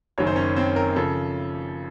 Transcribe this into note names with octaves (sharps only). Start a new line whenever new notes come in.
F#1 F#2 D#3 C#5
C5
C#4 C#5
C4 C5
A#4
C#3 F3 A4